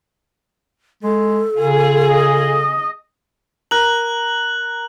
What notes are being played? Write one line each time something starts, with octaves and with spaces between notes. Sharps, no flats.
G#3 A4
C#3 F4 G#4
D#5
A#4 F#6 F#7